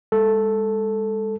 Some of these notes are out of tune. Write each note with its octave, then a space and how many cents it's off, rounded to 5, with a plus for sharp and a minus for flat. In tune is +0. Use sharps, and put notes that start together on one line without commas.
G#3 -40 A4 +0